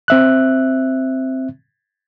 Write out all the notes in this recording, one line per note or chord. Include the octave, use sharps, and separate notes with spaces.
C4 E5 F#6